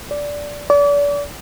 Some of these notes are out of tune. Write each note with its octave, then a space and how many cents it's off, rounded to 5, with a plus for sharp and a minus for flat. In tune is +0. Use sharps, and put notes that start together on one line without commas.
D5 -10
D5 -35